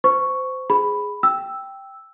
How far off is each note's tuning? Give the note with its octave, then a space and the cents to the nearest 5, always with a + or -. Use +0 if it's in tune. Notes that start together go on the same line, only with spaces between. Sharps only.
C5 -25 C#6 +0
G#4 +0 B5 +0
G5 +0 E6 +0